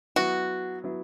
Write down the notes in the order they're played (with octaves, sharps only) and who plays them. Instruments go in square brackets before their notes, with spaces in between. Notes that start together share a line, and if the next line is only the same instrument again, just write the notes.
[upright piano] F#3 B3 E4 [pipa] F#4
[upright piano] F#3 B3 E4